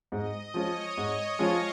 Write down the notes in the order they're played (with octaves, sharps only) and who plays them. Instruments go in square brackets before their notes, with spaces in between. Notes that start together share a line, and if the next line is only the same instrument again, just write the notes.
[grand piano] G#2 [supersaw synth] D#5
[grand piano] F3 G#3 C#4 F4 [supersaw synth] C#5
[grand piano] G#2 [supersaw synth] C#5
[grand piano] F3 G#3 C#4 F4 [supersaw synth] F5